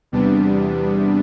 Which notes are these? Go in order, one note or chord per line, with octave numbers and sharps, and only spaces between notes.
E2 C3 G3 B3 D4